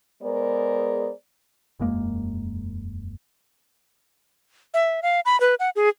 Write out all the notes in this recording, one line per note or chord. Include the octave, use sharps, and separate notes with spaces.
G#3 B3 G#4 A#4 C5 D5
E1 F#2 G#3 A#3
E5
F5
B5
B4
F#5
G#4